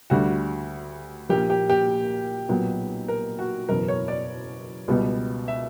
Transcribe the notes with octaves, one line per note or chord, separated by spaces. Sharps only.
D2 D3 G3 F#4
A#1 A#2 A#3 G4
G4
G4
B1 A#2 F#3 B3
A#4
F#4
F#1 E2 B2 A#4
C#5
D5
C#2 B2 G3 B3
E5